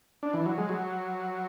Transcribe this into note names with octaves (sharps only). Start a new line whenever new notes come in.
D4
E3
F#3
G#3
F#3